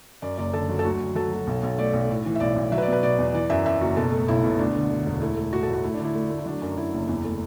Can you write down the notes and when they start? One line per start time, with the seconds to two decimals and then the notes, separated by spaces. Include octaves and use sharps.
0.22 F#2 D5
0.38 F#1 D5
0.53 D3 A4
0.69 F#3
0.79 A4
0.85 D2 F#4
1.01 D2
1.15 F#3 A4
1.32 F#3
1.47 B1
1.63 B1
1.78 A3 D5
1.93 B1
2.10 A2
2.26 E3
2.35 E5
2.40 B1 D5
2.56 B1
2.72 F#3 E5
2.78 B4
2.82 D5
2.88 B2 B4
3.03 B2 D5
3.19 E2
3.34 E3 D5
3.50 F#2 E5
3.65 F#2 E5
3.81 F#1 F#4
3.97 B2 A4
4.12 A3
4.28 B1 E4
4.44 B2
4.59 D2 D4
4.75 D3
4.90 D3
5.06 E1
5.21 A3 E4
5.37 A3
5.53 A2 F#4
5.63 A4
5.68 A1 F#4
5.84 A3 E4
5.94 D4
6.00 D3
6.05 E4
6.15 A3
6.30 A3
6.39 E4
6.46 F#3 D4
6.62 F#2
6.77 F#2 E4
6.93 F#1
7.08 E2 E4
7.25 A3